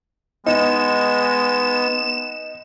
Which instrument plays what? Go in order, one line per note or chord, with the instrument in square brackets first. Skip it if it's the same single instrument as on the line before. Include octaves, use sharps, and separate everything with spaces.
[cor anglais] G#3 [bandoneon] B3 [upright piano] D#4 [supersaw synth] E7